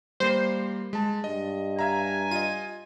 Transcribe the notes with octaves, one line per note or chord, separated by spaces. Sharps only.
G3 A#3 C5 C7
G#3 A5
G2 D#5
E5 F5 G#5 A#5
F4 D#5 D#7